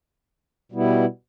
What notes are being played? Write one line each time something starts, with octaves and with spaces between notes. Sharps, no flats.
B2 G3 B3 E4